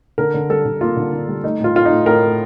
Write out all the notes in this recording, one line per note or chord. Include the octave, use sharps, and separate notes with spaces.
D3 A#4
D3
G3 A4
D3
A#3 F4
D3
D3
G3
A3 D#4
A2 F4
A2 F4
D#4
A2
A2 A#4
A2